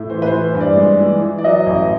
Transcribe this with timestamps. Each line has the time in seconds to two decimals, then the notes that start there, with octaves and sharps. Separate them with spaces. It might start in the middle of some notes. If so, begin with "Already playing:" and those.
Already playing: A2
0.10 E3 C5
0.22 B4
0.26 C5
0.32 E3
0.44 C5
0.55 G2
0.60 D5
0.77 G#3
1.00 E3
1.22 E3
1.38 D5
1.44 F#3 D#5
1.66 A1